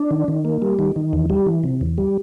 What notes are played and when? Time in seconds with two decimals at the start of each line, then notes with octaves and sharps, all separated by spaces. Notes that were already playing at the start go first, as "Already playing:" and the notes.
Already playing: D4
0.11 D#3
0.28 D#3
0.45 A#3
0.62 G3
0.79 D#3
0.96 D#3
1.13 E2
1.30 G3
1.46 E3
1.64 C3
1.81 E2
1.98 G3